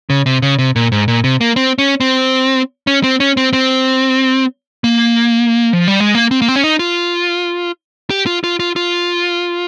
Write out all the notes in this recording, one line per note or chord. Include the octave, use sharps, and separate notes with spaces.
C#3
C3
C#3
C3
A#2
G#2
A#2
C3
A#3
C4
C#4
C4
C#4
C4
C#4
C4
C4
A#3
F3
G3
G#3
A#3
C4
A#3
C4
C#4
D#4
F4
G4
F4
F4
F4
F4